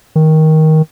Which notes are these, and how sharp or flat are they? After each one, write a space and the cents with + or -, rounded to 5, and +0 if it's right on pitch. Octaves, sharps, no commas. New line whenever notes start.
D#3 +15